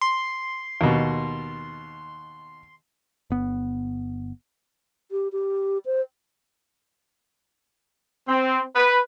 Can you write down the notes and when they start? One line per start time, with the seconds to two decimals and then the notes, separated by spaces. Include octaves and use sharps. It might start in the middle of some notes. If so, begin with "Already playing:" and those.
0.01 C6
0.81 D#2 B2
3.30 G1 B3
5.11 G4
5.32 G4
5.86 C5
8.28 C4
8.76 B4